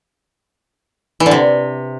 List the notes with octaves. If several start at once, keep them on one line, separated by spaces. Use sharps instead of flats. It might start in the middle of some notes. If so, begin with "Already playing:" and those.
E3
D3
C3